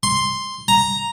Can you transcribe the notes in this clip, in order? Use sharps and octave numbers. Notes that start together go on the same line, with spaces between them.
C6
A#5